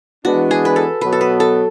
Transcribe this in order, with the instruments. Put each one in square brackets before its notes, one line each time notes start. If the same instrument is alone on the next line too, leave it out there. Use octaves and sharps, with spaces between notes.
[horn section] E3 G#3 B3 D4 [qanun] F#4
[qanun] G#4
B4
A4
[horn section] B2 F#3 B3 [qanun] B4
[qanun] A4
B4
A4